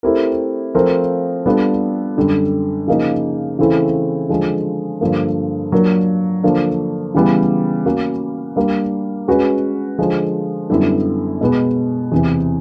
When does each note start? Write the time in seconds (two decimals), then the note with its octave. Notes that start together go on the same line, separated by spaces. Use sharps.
0.03 A3 C4 E4 G4 A#4
0.74 F3 A3 C4 F4 A#4
1.46 G3 B3 D4 F4 A4
2.17 F#2 D3 G3
2.88 C#3 F3 A#3 D#4
3.59 C#3 E3 A3 C4 E4
4.29 D3 F3 G#3
5.01 G2 D3 F3 A#3
5.72 F#3 A#3 D4 F4 A#4
6.43 D3 F3 A#3 D4
7.15 C#3 E3 G3 B3
7.86 A#3 C#4 F#4
8.56 G3 A#3 D4
9.28 G#3 C#4 F#4 B4
9.99 D3 F3 G#3
10.70 F#2 D3 G3 B3 E4
11.41 B2 G#3 B3
12.12 E2 C3 E3